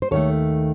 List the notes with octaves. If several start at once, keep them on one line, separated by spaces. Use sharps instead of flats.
C5
D#2 D#3 A3 A4 C#5